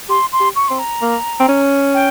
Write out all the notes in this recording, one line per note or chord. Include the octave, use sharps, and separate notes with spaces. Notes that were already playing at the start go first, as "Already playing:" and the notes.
G4 C6
C6
G4
C#6
C4 C6
A#5
A#3
C4
C#4
G5